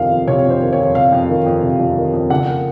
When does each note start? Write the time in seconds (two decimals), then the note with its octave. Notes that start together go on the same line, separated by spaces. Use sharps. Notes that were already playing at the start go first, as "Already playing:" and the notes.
Already playing: F2 C3 D#3 F5
0.11 F2
0.27 C3 C#5
0.45 F2
0.50 C5
0.61 D#3
0.73 C#5
0.78 F2
0.95 C3 F5
1.12 F2
1.29 D#3
1.46 F2
1.63 C3
1.80 F2
1.96 D#3
2.13 F2
2.30 C#3 F#5
2.47 A#3